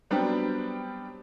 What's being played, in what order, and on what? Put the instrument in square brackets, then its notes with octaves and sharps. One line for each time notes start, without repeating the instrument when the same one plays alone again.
[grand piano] F#3 G3 B3 C4 D4 G4